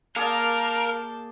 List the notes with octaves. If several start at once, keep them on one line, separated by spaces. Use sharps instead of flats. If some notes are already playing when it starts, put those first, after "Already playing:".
A#3 G#4 A#4 D5 F5 A5 G6